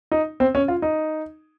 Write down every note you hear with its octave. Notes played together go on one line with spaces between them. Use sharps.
D#4
C4
C#4
F4
D#4